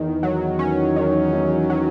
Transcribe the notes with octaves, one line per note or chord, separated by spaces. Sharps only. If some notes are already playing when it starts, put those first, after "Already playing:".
Already playing: E2 D#3
F#3
C#4
D#3
E2
F#3